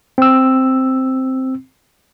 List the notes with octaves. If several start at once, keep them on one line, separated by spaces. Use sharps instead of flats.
C4 E6